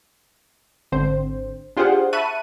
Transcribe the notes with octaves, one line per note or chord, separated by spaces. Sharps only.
G#1 D3 C4 C5
D4 F4 G4 G#4 C5 F#5
E5 A5 B5 C#6 F#6 D#7